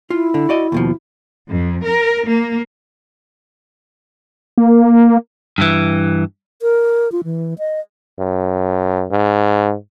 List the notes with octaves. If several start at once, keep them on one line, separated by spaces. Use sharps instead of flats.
E4 F4
D3
F#4 D5 D#5
D#2 B2 F3
F2
A#4
A#3
A#3
G2 E3
A#4
F4
E3
D#5
F#2
G#2